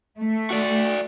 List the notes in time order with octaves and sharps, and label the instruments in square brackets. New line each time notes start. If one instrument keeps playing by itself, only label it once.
[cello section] A3
[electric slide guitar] F#4 D5